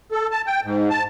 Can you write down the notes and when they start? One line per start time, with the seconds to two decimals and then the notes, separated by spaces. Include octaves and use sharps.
0.12 A4
0.31 A5
0.47 G5
0.63 G#2
0.90 A5